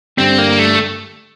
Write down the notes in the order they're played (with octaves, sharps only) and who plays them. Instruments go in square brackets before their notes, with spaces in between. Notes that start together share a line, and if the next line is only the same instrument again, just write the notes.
[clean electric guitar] G2 D3 G3 [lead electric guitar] C4
[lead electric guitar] A#3
A3